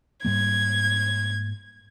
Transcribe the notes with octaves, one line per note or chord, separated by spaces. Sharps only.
G#2 G3 A#3 G#6